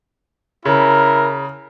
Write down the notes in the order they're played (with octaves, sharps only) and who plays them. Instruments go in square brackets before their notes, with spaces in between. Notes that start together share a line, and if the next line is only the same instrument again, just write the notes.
[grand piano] C#3 [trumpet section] E4 A#4